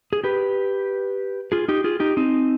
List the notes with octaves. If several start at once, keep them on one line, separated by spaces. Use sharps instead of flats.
G#4
G4 B4
F4 G#4
D#4 G4
F4 G#4
D#4 G4
C4 D#4